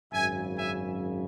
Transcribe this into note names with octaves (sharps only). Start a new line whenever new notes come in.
G#1 F#2 C#3 E5 G#5
E5 G#5